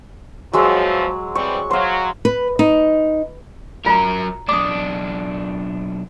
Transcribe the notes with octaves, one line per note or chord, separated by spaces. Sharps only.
E2 F3 F#3 G#3 E6
E3 G3 C4 C#6
F#3 C5 F5
B4
D#4
F#3 F4 A#4 A#5
B1 D4 D6 D#6